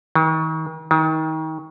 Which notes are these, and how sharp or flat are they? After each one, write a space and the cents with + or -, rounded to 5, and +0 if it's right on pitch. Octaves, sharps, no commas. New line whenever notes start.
D#3 +40
D#3 +30